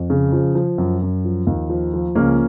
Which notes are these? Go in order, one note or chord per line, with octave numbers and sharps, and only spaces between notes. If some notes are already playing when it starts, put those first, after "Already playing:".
Already playing: F2
C#3
F3
F3
F#2
F#2
F3
D#2
F3
F3
C#2 A#3 C#4